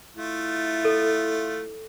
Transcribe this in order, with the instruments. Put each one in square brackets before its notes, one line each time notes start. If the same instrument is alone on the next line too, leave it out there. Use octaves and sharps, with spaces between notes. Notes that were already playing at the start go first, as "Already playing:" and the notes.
[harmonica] A3 F4 [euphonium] E4
[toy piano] A4